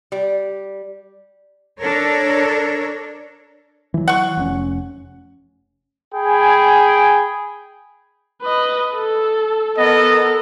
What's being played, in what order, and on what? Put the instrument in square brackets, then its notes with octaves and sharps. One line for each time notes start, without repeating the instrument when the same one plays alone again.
[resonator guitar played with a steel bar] G3
[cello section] D4 A4 A#4 C#5
[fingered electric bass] E3 F#3
[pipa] F#5 C#6
[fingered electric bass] F1 A#2 C#4
[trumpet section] G#4 G5 G#5 B5
[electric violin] B4 D#5
A4
[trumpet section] B3 D#5 [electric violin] A4 A#4